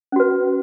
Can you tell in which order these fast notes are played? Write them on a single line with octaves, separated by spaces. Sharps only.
C#4 F#4 B4